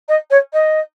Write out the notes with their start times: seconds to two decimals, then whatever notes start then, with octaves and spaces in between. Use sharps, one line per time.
0.08 D#5
0.30 C#5
0.53 D#5